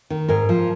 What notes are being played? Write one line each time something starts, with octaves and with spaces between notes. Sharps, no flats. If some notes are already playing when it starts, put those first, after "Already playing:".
D#3
G#2 A#4
F3